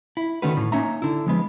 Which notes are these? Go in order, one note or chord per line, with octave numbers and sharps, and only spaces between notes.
E4
D3 D#3 A3 C#4 F#4 B4
A2
A#3 C#4 D#4 E5 A#5
D3 E4
F3 G#3 B3